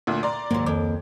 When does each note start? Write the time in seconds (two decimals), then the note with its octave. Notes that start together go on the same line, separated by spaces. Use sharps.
0.07 D2 A#2
0.23 D5 A#5 C6
0.51 C#2 G#2 D#3 F#3 A#3
0.66 F2 D6